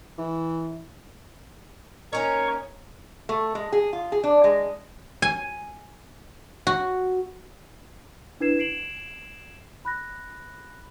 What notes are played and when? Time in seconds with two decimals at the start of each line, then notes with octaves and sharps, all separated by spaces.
0.18 E3
2.13 A#3 C#4 D#4 A#4 C#5 C#6
3.29 A3
3.55 G#3
3.72 G#4
3.93 F4
4.12 G#4
4.24 D4
4.44 G#3
5.22 G#5
6.67 F#4
8.40 D4 E4 B4 G#6 C7 E7
8.58 G#6 C7 D7 E7 F#7
9.85 B5 F#6 A#6